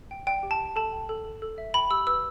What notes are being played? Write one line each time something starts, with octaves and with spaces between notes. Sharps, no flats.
G5
D5 G5
G4
A5
G5
A4 A5
G5
A4
A4
A4
E5
G5 B5
G4 E6
B4 E6